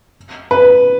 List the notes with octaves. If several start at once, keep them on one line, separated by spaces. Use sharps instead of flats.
B4